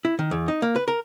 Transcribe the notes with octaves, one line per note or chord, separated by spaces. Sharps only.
E4
D#3
E2
D#4
A#3
B4
A#4